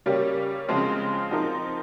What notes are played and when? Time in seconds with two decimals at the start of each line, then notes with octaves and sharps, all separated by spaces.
0.06 C#3 G3 A#3 C#4 G4
0.69 C#3 F3 G#3 C4
1.31 F3 C4 D#4 A#4